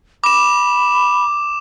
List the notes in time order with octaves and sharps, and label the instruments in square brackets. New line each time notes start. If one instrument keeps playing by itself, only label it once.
[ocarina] B5 [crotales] D6 E7